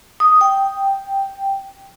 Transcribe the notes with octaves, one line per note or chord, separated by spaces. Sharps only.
D#6
G5